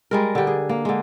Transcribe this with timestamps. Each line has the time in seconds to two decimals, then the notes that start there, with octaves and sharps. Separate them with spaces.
0.11 G3 G#3 A#4
0.35 D3 G4
0.47 G#4
0.69 A#3
0.85 D3 G#3